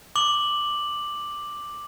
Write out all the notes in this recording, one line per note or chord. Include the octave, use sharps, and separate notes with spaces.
D6 F#7